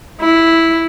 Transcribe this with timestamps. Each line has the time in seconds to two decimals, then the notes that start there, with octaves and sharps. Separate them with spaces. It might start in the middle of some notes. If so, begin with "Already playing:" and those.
0.21 E4